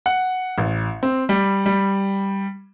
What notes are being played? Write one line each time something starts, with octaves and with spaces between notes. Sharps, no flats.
F#5
A1
C4
G3
G3